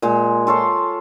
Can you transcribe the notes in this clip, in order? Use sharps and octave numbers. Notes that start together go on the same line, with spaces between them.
A#2 G#3 A#3
F4 A4 C#5 C6